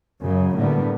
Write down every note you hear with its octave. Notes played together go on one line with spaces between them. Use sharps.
F#2 C#3
A2 D3 G3 A#3 B3